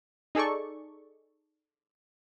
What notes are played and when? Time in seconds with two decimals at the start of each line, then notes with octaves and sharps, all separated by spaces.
0.35 D#4 G#4 A4 D5 C#6